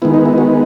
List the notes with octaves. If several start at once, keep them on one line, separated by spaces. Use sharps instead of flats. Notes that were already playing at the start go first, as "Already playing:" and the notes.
D#3 G#3 B3 E4
D#4
E4
F#4